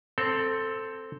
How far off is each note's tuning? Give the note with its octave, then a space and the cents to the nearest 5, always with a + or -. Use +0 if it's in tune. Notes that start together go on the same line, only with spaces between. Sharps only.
C4 +0 A4 +10